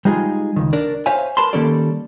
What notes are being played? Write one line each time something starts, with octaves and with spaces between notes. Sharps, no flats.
G3 G#3 D#4 F4 G#4
C#2 D#3
D4 A#4 D5
C5 C#5 E5 F5 G#5
A#4 B4 A5 B5 C6
D#3 G3 A#3 C#4 A4 D5